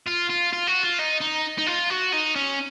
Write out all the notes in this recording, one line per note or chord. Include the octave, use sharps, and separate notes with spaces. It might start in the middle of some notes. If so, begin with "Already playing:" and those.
F4
F4
F4
F#4
F4
D#4
D#4
D#4
F4
F#4
D#4
C#4